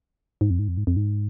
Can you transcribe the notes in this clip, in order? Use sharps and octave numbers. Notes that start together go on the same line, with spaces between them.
G#2
F2
G#2
F2
G#2
F2
G#2